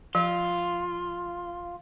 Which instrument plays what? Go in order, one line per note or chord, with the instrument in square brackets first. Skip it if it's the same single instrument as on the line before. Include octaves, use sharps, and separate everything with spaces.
[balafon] F3 [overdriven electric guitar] F4